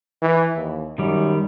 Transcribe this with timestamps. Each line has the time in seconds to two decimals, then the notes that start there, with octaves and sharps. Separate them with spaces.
0.22 E3
0.56 D#2
0.98 F#2 D#3 G3